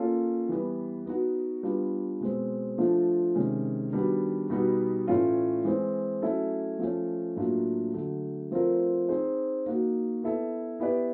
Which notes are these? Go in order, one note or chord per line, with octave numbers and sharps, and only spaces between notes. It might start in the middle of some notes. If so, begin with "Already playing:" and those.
Already playing: A#3 C#4 F4 A4
E3 G3 B3
B3 D#4 F#4
G3 B3 D4 F4
B2 G#3 C4
F3 A3 D4 F4
C3 D#3 G#3 C#4
D#3 G3 B3 D4 F#4
B2 G3 B3 D#4 F#4
A2 E3 A3 C#4 F4
E3 G#3 C4
F#3 A3 C#4 E4 A4
F3 A3 C#4
A2 F#3 A#3 D4 F4
D3 F#3 A3
F3 A3 C4 F4 A#4
C4 D#4 G#4 C5
A#3 D#4 F#4
B3 E4 A4
B3 E4 G4 B4 D5